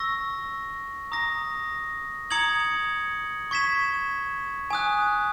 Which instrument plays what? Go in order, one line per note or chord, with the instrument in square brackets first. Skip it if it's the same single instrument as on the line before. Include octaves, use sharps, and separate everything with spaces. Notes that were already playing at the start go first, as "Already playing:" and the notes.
Already playing: [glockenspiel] C#6 E6 A#6
A#5 D#6 A#6
A#5 D#6 G#6 C#7 F#7
C#6 G#6 B6 E7
G#5 D#6 F#6